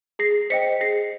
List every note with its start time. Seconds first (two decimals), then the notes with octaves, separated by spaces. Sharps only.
0.19 G#4 A#6 C7
0.50 C5 D#5 G5 B6 C#7
0.81 G#4 A#6 C7